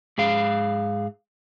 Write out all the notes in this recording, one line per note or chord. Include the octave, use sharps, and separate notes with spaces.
G#2 G#4 F5